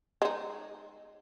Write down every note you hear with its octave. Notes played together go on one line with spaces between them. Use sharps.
G#3 D#4